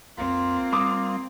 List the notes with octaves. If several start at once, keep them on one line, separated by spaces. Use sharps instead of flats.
B1 F2 A#3 C4 F4
G3 D6 D#6